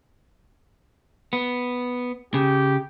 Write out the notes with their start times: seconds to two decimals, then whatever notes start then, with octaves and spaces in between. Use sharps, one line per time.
1.33 B3
2.34 C#3 G4